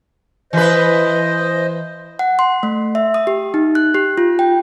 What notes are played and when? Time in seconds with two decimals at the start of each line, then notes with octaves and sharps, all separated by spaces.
0.53 E3 B4 C5 D#5
2.19 F#5
2.39 C6
2.63 A3
2.95 E5
3.14 D#6
3.27 G4
3.54 D#4
3.75 F#6
3.94 G4
4.18 F4
4.39 G5